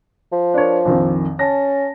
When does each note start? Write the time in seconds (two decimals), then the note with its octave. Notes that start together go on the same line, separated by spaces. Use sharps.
0.32 F3
0.54 D4 A#4 C#5
0.85 A#1 F2 D#3
1.39 C#4 A5 A#6